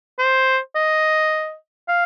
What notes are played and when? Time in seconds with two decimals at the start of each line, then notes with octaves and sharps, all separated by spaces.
0.19 C5
0.75 D#5
1.88 F5